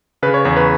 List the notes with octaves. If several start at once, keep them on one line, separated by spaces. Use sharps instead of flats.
C#3 B4
C#5
E2 C#5
B4